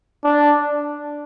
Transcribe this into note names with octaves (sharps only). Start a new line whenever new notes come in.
D4